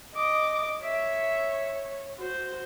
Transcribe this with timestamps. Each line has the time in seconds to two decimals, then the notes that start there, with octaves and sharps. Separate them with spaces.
0.15 D#5 D6
0.82 C#5 E5
2.16 F#4 C5